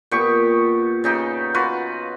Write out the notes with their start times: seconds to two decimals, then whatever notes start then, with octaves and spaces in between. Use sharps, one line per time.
0.11 A#2 B3 G4 C#6
1.04 C#3 D#4 G4
1.54 F4 F#4 B4